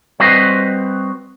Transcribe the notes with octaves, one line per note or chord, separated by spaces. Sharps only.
G3 C4 F#4 B4 C5 D#5